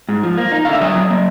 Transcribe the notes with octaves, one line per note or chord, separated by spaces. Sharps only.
G#2
F3
A#3
D#4
D3 F5
E5
F#3 C#5 D#5
F#3
A#3